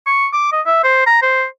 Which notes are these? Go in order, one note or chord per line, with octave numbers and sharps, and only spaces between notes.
C#6
D6
D#5
E5
C5
A#5
C5